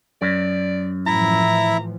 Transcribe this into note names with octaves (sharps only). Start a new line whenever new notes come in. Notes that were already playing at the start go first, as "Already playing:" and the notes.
F#2 D5
A2 E3 F3 E4 E5 A#5